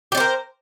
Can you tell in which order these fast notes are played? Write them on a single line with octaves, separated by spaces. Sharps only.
G4 D5 C5 A#4